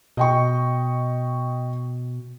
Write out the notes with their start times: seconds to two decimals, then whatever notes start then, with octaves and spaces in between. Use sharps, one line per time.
0.17 B2 D#5 G5 C#6